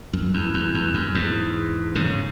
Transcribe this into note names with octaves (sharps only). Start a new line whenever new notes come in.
F#2
E2
E2
E2
F#2
E2 G#2
G#2 C#3